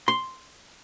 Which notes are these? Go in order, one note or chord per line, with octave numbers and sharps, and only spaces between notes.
C6